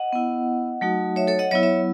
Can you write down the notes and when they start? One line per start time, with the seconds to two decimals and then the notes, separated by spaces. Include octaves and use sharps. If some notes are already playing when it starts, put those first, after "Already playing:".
Already playing: D#5 F#5
0.13 B3 E4
0.81 F#3 A3 D#4 F#4
1.16 C#5 E5
1.27 A4 C#5
1.39 D#5 F#5
1.51 F#3 B3 E4 C#5 E5
1.63 C#5 E5